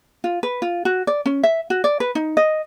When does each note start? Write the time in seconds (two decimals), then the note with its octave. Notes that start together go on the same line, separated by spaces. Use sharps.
0.24 F4
0.43 B4
0.62 F4
0.85 F#4
1.07 D5
1.26 C#4
1.43 E5
1.70 F#4
1.84 D5
2.00 B4
2.15 D#4
2.37 D#5